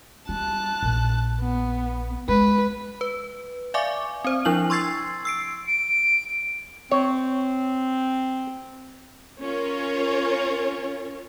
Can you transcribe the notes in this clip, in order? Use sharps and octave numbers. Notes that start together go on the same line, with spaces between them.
G3 A5 F#6
A#1
B3
G#3 B4
B4
D5 E5 F5 G#5 C#6 D6
C4 C5
F3 D4 E4 F#7
C6 C#6 E6 G#6 A6 C7
E6 C7 D7
D7
C4 C#5
C#4 F4 A#4 C#5